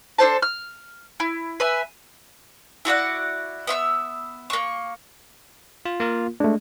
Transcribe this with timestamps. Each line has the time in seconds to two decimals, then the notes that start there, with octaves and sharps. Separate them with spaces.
0.18 D4 A4 C5 A5
0.42 F6
1.20 E4
1.60 B4 E5 G#5
2.85 E4 F#4 D5 F#5
3.67 B3 E5 C#6 E6
4.50 A#3 C#6
5.85 F4
6.00 A#3 F4 A#4
6.40 G#3 A3 D4